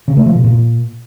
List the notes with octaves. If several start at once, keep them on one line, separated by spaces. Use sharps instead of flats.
C#3
A3
F3
B2
A#2